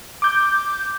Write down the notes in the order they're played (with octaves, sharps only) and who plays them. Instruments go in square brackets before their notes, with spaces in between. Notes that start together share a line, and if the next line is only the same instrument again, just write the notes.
[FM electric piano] D6 G6